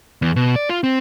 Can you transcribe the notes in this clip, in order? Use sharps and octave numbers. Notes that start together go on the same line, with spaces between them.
E2
B2
D5
F4
C4